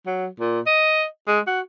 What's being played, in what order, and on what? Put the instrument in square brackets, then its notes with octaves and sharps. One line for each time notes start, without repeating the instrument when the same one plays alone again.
[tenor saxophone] F#3
A#2
D#5
G#3
F#4